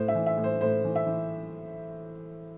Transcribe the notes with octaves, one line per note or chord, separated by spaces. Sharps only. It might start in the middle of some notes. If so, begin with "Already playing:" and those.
Already playing: A2 C5
E5
E3
E5
A2
C5
A2 C5
E3
E5
E3